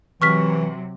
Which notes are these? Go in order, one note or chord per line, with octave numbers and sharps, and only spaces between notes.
C3 E3 F#3 C#6 F6 B6